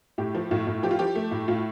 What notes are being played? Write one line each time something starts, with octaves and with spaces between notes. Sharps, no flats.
A2 G4
F3
A2 F4
A2
F3 G4
F4
F3 G4
A3
A2
A2 F4